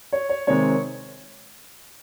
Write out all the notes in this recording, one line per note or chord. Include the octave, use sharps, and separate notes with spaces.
C#5
C#5
C3 D#3 G#3 C4 C#5